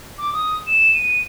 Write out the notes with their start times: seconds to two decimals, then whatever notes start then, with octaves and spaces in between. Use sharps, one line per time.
0.18 D6
0.33 D#6
0.67 E7
0.94 D#7